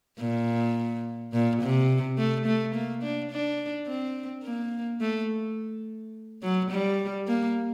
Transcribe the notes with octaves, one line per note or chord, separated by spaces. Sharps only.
A#2
A#2
C3
A3
A3
A#3
D4
D4
C4
A#3
A3
F#3
G3
A#3